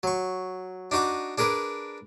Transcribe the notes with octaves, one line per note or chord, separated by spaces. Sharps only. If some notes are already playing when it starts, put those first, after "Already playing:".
F#3 C#6
D4 D#4 F#4 D#5 D6
D4 G#4 A#4 B4 D5